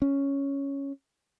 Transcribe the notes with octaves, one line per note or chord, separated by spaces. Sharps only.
C#4